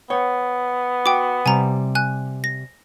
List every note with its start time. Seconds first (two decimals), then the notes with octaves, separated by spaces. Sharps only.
0.10 B3 C#5 G5
1.06 F#4 G5 D6
1.46 C3 G3 G#5 A#5
1.95 G#5 F#6
2.44 A#6